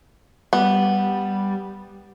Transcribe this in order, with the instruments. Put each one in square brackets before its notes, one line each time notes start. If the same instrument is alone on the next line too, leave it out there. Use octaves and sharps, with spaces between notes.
[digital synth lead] G3 [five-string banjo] B3